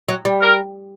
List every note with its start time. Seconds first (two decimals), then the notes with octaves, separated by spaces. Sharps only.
0.08 F#3
0.25 G3
0.41 A#4